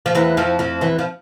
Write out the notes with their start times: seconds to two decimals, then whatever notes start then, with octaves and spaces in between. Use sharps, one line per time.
0.06 F3
0.15 E2 E3
0.37 F2 F3
0.59 F2 F3
0.81 E2 E3
0.99 F3